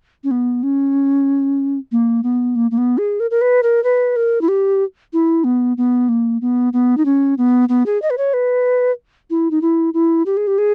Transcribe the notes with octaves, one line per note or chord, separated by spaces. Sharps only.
C#4
B3
C#4
A#3
B3
A#3
A#3
B3
G#4
A#4
A#4
B4
A#4
B4
A#4
E4
G4
E4
B3
B3
A#3
B3
B3
D#4
C#4
B3
B3
G#4
D#5
B4
C#5
B4
E4
D#4
E4
E4
G4
G#4
G4
G#4